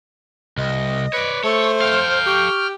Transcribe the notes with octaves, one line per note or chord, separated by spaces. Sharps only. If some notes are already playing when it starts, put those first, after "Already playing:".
C2 D#5
B4 C#5 D5
A3 A4 C5 C#5
A4 F5 G5 F6
G4 C#6